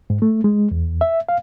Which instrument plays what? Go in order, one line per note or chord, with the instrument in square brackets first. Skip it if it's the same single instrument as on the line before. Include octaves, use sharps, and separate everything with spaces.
[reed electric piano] G#2
A3
G#3
E2
E5
F5